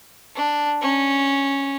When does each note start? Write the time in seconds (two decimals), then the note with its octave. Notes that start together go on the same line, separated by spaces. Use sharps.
0.36 D4
0.81 C#4